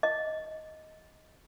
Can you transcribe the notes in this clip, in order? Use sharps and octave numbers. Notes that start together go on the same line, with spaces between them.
D#5